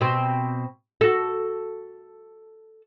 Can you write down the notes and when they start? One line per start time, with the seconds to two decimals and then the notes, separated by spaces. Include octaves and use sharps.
0.01 B2 C4
1.01 F#4 A4